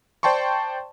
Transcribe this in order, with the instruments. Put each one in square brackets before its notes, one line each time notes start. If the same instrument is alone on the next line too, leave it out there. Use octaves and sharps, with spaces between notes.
[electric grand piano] C5 D5 G5 A5 C6 C#6